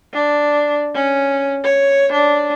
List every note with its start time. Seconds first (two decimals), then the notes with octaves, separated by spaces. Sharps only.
0.13 D4
0.95 C#4
1.65 C#5
2.13 D4